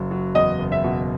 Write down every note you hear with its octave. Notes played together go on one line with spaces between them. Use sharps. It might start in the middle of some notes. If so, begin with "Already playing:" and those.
Already playing: F#1 F#3
F#3
E2 D#5
F#1
E5
B2